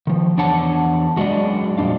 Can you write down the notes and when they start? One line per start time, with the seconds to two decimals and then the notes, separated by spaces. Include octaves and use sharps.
0.07 D#3 F3
0.37 E2 D4 C#5 F#5 A5
1.17 F#2 F#3 G#3 D4 D5 D#5
1.78 F2 A#2 G3 D4 F5